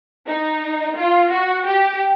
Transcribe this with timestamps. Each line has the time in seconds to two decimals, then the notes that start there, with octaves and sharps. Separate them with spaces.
0.27 D#4
0.96 F4
1.31 F#4
1.66 G4